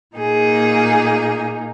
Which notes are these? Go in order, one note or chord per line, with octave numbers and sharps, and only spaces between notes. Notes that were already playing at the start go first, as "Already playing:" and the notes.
A#2 A#3 D#4 G#4